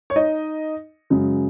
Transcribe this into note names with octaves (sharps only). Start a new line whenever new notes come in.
C#5
D#4 D#5
F#2 C#3 G#3